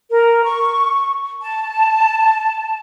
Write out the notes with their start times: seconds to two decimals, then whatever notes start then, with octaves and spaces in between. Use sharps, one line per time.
0.11 A#4
0.44 C#6
1.41 A5